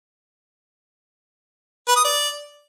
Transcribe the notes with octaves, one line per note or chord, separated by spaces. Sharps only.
B4
D#6
D5